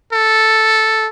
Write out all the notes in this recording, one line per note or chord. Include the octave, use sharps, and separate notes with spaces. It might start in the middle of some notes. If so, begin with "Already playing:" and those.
A4